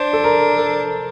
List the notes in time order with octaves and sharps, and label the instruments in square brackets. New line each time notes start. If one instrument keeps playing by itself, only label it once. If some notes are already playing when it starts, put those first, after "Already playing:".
Already playing: [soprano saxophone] D4 [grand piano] C5
[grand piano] A4
A#4
A4